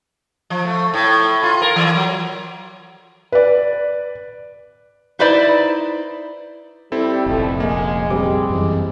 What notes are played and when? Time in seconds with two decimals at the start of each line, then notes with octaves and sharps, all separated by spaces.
0.50 F3
0.65 A3
0.94 A2
1.43 F4
1.62 A#4
1.76 E3
1.95 F#3
3.32 B4 D5
5.19 D#4 E4 B4 C5 D5
6.92 G3 C4 E4 A4
7.26 F1 A#1 B2 F3 A3
7.60 G#3 A#3
8.10 G3 G#3 C4 D6
8.50 F#2 E3